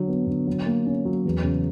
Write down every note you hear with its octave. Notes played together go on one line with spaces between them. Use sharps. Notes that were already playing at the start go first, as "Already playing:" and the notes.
Already playing: D3 F#3
B3
D3
F#3
A#3
C#4
F#3
E2
C#3